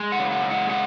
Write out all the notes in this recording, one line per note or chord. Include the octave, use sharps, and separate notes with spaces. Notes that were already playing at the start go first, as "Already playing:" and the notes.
Already playing: G#3
F#5
C#3
F#5
G#3
F#5
C#3 F#5